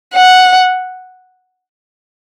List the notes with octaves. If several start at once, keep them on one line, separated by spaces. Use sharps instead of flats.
F#5